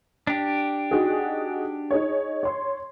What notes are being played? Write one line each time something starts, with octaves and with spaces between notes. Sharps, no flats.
D4 G4
D#4 F#4 G#4
D#4 G#4 C#5
C#5 C6